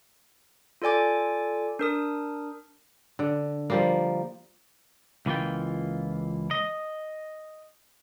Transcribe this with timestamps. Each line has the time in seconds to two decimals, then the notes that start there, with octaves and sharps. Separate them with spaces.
0.82 F4 A4 D5 G#5 D6
1.79 D4 A#4 D#6
3.19 D3
3.70 F3 G3 A#3
5.26 C#2 E3 A#3 F4 G5
6.51 D#5